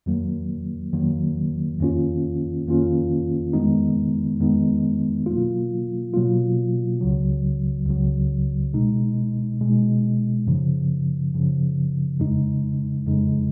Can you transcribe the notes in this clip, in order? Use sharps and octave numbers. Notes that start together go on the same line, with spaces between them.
F2 D#3 F#3 A#3
F2 D#3 F#3 A#3
F2 D#3 A#3 C#4 F4
F2 D#3 A#3 C#4 F4
F2 D#3 G#3 B3 D#4
F2 D#3 G#3 B3 D#4
B2 F#3 A#3 F4
B2 F#3 A#3 F4
C#2 C#3 F#3
C#2 C#3 F#3
B2 G#3 D#4
B2 G#3 D#4
F#2 C#3 F3
F#2 C#3 F3
F2 C#3 G#3 D#4
F2 C#3 G#3 D#4